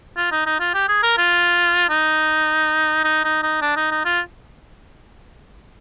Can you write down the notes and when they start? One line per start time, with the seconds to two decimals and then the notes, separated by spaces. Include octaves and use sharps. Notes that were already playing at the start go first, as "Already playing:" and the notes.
0.17 F4
0.31 D#4
0.46 D#4
0.60 F4
0.74 G4
0.89 G#4
1.03 A#4
1.18 F4
1.89 D#4
3.05 D#4
3.24 D#4
3.43 D#4
3.62 D4
3.76 D#4
3.91 D#4
4.05 F4